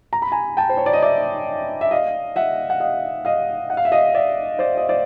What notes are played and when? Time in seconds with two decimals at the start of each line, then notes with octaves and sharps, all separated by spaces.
0.13 A#5
0.22 B5
0.32 G#5 A#5
0.57 G5 A5
0.69 C5
0.77 C#5
0.86 D5
0.93 D#5
1.02 D5 E5
1.81 E5
1.91 D#5 F5
2.36 E5 F#5
2.70 F#5
2.80 D#5 F5
3.25 D#5 F5
3.70 F#5
3.77 F5
3.85 E5
3.92 D#5 F5
4.14 D5 E5
4.59 C5 D5
4.77 D#5
4.89 C5 D5